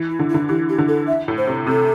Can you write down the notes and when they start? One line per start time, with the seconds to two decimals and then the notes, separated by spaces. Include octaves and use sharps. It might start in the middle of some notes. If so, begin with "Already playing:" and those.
Already playing: E3
0.10 E4
0.19 D3
0.30 E4
0.34 D3
0.48 E3 G4
0.69 G4
0.78 D3
0.88 A4
1.08 E5
1.28 A2
1.38 C5
1.47 C3
1.67 C3 A4